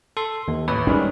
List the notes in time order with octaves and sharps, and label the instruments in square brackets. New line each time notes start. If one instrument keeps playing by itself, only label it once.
[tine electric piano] A4 C6
D#2
[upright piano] A1 [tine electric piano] B4
[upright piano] D#3 G3 G#3 [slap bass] C#4